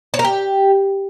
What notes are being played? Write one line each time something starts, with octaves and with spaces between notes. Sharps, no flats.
C#5
A#4
G4